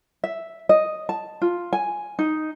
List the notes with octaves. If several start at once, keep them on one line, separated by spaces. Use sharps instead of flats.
E5
D#5
A5
F4
G#5
D#4